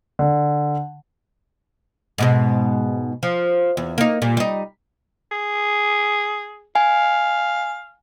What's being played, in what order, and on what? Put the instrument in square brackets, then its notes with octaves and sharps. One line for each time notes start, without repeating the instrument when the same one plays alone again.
[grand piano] D3
[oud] G#2 B2 G#3
F3
E2
A#3 D#4
A#2 G3
G3 D#4
[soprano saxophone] G#4
[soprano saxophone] F5 [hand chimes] G#5